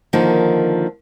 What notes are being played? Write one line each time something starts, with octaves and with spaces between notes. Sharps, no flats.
D3 D#3 F3 A#3 D#4